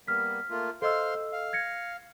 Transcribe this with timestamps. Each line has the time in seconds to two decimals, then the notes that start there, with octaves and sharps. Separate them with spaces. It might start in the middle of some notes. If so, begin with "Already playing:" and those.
0.08 G3 A#3 B3 F6 B6
0.50 A3 A#3 F4
0.82 A4 C5 D#5 F5 C6 E6
1.32 F5
1.53 G#6 A#6 C#7